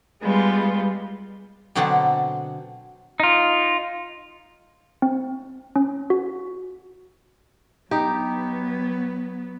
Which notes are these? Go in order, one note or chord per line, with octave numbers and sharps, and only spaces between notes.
G3 G#3 B3 F4
B2 D3 F#3 C4 D4 A5
D#4 F4
C4
C#4
F#4
F#3 B3 D#4 G4